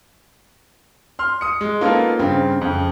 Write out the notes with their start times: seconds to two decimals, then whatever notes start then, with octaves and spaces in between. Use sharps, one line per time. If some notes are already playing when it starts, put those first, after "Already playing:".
1.19 C6 F6
1.41 D#6 C#7
1.61 G#3
1.81 A#3 B3 C#4 D#4 F4 A4
2.19 G2 C#3 C4
2.61 F2 C#3